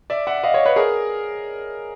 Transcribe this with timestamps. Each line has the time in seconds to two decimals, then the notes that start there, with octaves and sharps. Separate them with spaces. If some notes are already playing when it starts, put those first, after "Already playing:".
0.10 D5 E5
0.27 E5 F#5
0.43 D#5 F5
0.54 C#5 D#5
0.65 B4 C#5
0.76 G#4 A#4